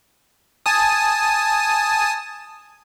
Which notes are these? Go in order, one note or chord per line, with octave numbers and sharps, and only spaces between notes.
G#5 A5 D#6